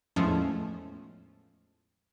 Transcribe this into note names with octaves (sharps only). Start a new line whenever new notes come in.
E2 A2 F3 G#3 A3 C#4